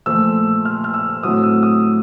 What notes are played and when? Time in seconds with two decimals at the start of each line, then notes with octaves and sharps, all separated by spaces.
0.06 A#2 F3 A3 E6
0.65 F6
0.84 F6
0.94 E6
1.23 A2 F#3 A3 C4 D#6
1.43 E6
1.63 D#6